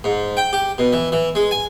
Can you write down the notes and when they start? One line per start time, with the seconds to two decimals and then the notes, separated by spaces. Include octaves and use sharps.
0.04 G#2
0.37 G5
0.53 G4
0.78 B2
0.93 E3
1.12 E3
1.35 G#3
1.51 G#5